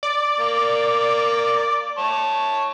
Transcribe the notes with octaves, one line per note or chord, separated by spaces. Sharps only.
D5
A#3
C#5 A5